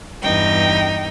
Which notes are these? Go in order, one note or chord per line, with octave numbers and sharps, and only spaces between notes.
E2 G2 D#4 G5